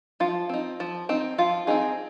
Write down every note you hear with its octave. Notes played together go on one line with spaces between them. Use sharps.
F3 F4
C4 D#4
F3
C4 D#4
F3 F4
C4 D#4 G#4